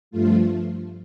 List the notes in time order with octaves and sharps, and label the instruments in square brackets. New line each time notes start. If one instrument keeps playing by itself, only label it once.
[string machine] G2 F3 A3 F4